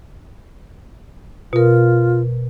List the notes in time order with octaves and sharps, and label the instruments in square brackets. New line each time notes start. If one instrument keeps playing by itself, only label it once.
[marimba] B2 A#4 [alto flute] F4